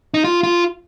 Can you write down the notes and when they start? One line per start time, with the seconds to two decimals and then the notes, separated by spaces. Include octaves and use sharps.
0.14 D#4
0.24 F4
0.43 F4